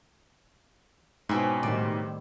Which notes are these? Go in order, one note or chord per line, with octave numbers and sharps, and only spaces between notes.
G#2 B2 C4 C#4 E4
A2 D#3 G3 D5